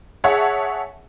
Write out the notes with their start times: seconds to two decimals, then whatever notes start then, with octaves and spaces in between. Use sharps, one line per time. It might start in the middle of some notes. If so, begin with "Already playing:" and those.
0.24 G#4 C#5 E5 F#5 A5